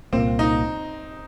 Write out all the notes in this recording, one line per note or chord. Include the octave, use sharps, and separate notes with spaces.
C2 A#2 A#3 C4
D#4